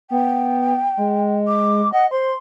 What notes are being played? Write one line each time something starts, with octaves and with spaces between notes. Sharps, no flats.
B3 G5
G#3
D6
D#5 F#5
C5 C6